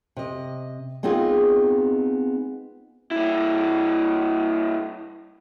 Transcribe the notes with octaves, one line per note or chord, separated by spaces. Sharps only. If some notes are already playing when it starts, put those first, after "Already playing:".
C3 D#5
G#3 B3 C4 D#4 F4 G#4
G2 E4